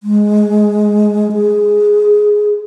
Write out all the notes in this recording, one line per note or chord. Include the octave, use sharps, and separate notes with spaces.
G#3
G#4